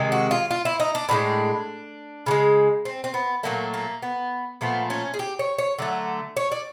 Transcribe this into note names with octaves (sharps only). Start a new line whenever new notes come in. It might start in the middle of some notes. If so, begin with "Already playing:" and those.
Already playing: C3 D#3 G#3
F#4
F4
F4
E4
D#4
D4
A2 F3 G#3 D4
C#3 E3 G#3
C4
C4
B3
A#2 F#3 A3 A#3
A#3
B3
A#2 F3 A3 B3
C#4
G#4
G4
C#5
C#5
D3 F#3 A3
C#5
D5